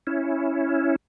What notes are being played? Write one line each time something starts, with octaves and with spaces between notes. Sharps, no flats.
C#4 E4